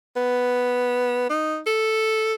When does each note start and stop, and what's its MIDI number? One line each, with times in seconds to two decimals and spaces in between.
0.17 1.27 59
1.30 1.60 63
1.67 2.34 69